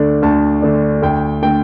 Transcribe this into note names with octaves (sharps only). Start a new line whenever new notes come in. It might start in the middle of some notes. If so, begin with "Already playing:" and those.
Already playing: D2 D3 A3 D4
D2 A5
D3 A3 D4
D2 G5
D3 A3 G5